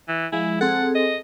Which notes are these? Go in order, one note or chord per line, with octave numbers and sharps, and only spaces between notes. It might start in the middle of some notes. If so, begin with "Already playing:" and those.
E3
F3 G#3 E4
C4 G#4 A4 F#5
D#5